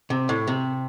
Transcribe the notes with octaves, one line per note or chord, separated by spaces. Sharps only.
C3
A2
C3